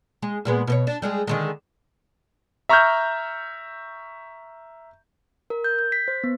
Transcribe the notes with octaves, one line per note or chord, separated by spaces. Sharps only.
G#3
A#2 G#3 B3
B2 B4 C#5
D4
G3 G#3 G#4
D3 D#3 G#3
E5 A#5 C#6 E6 F6 G6
A#4
G6
G6
B6
C5
B3